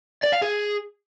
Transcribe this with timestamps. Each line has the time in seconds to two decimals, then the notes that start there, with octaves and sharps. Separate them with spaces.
0.23 D5
0.32 F5
0.42 G#4